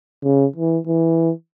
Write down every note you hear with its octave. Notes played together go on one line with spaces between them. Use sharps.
C#3
E3
E3